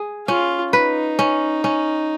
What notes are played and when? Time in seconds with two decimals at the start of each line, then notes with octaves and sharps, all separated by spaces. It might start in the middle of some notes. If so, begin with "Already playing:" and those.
Already playing: G#4
0.28 C#4 F4
0.73 D#4 B4
1.19 C#4
1.64 C#4